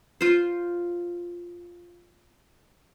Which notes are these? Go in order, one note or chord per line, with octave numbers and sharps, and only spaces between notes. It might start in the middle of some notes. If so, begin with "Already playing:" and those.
F4 C5